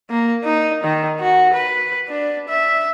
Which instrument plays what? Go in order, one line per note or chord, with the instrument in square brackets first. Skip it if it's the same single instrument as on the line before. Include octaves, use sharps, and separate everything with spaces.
[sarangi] A#3
D#4
D#3
F#4
B4
D4
E5